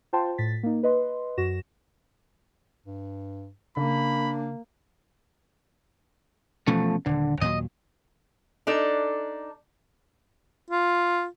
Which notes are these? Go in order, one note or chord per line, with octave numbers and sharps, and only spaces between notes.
F4 C5 G5 A5 C6
A2 A6 B6
A#3 D#4
B4 D#5 C6
F#2 F#4 A#6 E7
G2
C#3 A#3 D4 B5
B2 E3 F3 A3 C#4
D#1 D3
D#2 A#2 F#3 D#5
D4 D#4 A4
F4